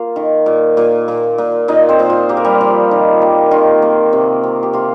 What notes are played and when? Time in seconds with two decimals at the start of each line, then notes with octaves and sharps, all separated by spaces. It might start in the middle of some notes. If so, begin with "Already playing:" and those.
Already playing: A#3 F4 F5
0.16 D#3
0.46 A#2
0.77 A#2
1.08 A#2
1.38 A#2
1.68 A#2 D#4 D#5
1.89 C4 C5
1.99 A#2
2.10 F4
2.29 A#3 G4
2.37 A#4
2.45 G3 G4
2.61 F3
2.91 D#3
3.22 A#3
3.51 D#3 F4
3.82 A#3
4.13 C3
4.43 C3
4.63 G4
4.73 C3 F4